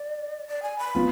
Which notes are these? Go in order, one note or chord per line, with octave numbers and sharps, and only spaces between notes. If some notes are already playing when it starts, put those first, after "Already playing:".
Already playing: D5
D5
G#5
B5
B3 F4